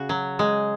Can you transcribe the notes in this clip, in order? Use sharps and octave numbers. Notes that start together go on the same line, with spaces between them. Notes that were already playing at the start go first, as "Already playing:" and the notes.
Already playing: C#3 F#4
F#3
G#3